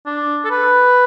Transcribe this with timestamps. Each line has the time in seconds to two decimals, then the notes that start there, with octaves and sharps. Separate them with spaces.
0.06 D4
0.45 A4
0.50 B4